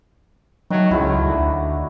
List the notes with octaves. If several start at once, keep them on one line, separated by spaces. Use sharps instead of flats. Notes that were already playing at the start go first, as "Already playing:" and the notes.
D#3 F#3 A3
C#2 E4 F#4 E5
D2